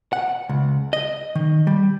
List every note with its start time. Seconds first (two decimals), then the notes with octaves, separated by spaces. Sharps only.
0.13 F#5
0.49 C#2
0.93 D#5
1.35 D#3
1.67 G3